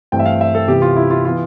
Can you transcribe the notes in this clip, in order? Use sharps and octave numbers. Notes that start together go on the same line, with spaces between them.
G2 E3 A3 C4 G5
E5
F5
E5
A4
C3 E3 B3 G4
F4
E4
F4
E3 B3 F4